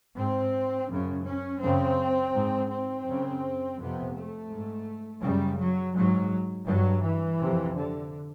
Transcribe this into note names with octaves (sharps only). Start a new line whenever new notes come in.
G#2 C4
F#2 C#3
C#4
F#2 C#3 C4
G#2
C4
F#2 C#3
F2 C3 B3
A3
G#2
F#2 C#3 G3
F#3
G#2 F#3
G2 F#3
E3
F2 C3
D3